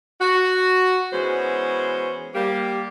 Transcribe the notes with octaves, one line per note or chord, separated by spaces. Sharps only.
F#4
E3 G#3 B3 C#4 F#4 C5
G3 A#3 G4